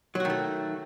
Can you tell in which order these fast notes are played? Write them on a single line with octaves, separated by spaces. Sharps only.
F#3 F#4 D#3 A3